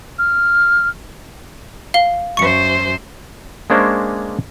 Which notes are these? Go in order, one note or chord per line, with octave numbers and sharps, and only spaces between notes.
F6
F5 G7
F#2 C5 C#6 C#7
G#3 A#3 C#4 D4 C5 C#5